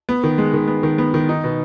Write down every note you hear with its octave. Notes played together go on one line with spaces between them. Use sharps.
B3
D#3
G#3
D#3
B3
D#3
B3
D#3
D#4
B2